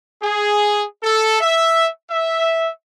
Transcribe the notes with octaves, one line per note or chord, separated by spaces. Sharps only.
G#4
A4
E5
E5